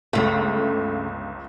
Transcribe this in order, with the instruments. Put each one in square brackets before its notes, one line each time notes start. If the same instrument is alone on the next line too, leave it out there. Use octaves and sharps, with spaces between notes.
[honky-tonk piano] G1 C#2 [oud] C#3 A3